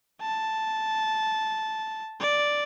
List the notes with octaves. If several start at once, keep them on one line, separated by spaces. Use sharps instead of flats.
A5
D5